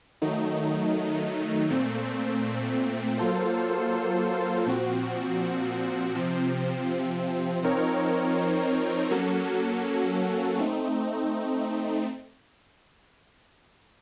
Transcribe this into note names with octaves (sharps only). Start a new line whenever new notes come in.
D#3 F#3 A3 D#4
A#2 A3 C4
F#3 A#3 F4 A4 C5
A#2 F3 C4 F#4
C3 F3 C4
F3 C4 D#4 A#4 C#5
F#3 A#3 C#4 F#4 A4
A3 C4 D#4